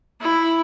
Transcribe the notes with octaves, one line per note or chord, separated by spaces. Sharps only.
E4